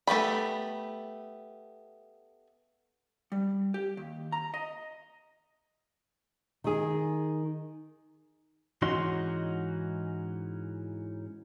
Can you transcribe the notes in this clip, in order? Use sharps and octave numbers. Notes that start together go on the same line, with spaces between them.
A3 B3 G4 B5
G3
G4
D#2
A#5
D#5
D#3 G#4
G#2 E3 C#4 D#4 F#4 C6